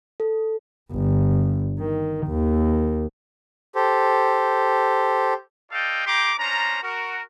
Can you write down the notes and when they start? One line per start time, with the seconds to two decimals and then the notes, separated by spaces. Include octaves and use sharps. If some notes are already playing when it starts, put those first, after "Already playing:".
0.20 A4
0.91 G1
1.79 D#3
2.27 D#2
3.75 G4 A4 C5
5.72 F4 A4 D5 D#5 F5 G5
6.06 A3 G4 G5 A#5 C6 D6
6.39 C#4 D4 F4 C5 A#5
6.82 F#4 A#4